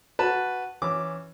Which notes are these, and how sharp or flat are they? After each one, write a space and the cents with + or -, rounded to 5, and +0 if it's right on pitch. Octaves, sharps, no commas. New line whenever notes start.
F#4 +0 B4 +0 A5 +0
E3 +0 C#4 +0 D6 +0